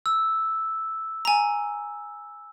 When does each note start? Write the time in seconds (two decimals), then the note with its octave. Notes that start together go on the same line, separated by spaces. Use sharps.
0.06 E6
1.25 G#5 A#5